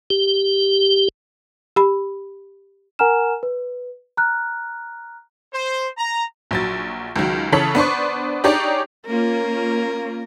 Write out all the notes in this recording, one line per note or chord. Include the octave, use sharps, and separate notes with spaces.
G4
G4 B5
A#4 F#5 G#5 A#5 F6 E7
B4
A#5 F6 F#6
C5
A#5
A#1 F#3 A6
C#2 D#3 F#3
C#3 E3 A4 C#5 B6 F#7
B3 D4 C5 C#6
D4 D#4 G4 G#4 C#5 D5
A#3 C#4 F4 A#4